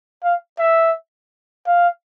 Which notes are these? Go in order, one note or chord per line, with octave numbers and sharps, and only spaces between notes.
F5
E5
F5